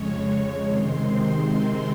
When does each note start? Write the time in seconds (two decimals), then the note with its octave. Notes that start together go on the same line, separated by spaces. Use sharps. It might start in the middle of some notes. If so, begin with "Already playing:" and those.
Already playing: F2 C#3 G#3 C#5
0.11 C#5
0.61 C3 D#3 G#3 C4 C6